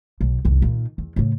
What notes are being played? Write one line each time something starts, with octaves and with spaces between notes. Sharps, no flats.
B1
F1 C2
A#2 D#3
E2
A2 C#3